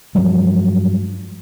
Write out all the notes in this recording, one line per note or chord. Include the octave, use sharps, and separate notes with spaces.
G2 F3 F#3 G#3